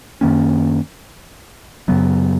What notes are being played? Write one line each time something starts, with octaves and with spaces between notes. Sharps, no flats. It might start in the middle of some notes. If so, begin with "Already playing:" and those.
F#2 D#3 A#3 C#4
F#2 C#3 F#3 B3